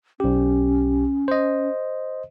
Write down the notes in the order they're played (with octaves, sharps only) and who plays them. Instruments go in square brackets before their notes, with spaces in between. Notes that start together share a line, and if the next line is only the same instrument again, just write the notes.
[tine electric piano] B1 G4 [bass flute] C#4
[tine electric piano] C5 D#5